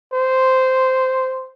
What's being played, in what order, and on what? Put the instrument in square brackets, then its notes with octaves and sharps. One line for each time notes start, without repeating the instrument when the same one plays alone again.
[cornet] C5